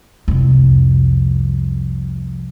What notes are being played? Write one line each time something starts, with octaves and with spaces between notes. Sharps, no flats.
C2 F2